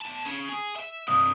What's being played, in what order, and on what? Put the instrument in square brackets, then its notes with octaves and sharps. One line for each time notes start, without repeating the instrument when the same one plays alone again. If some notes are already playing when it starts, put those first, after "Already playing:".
[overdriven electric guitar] E2 A5
C#3
G#4
E5
[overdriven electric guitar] C2 G2 [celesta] D#6